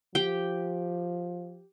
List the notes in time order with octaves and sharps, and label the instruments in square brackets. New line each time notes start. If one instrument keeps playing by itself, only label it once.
[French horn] F3 [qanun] G4 G5